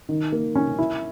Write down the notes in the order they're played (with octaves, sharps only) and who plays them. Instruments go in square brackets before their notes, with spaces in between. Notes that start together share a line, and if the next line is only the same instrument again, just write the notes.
[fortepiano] D#3
A#3
C#4
E4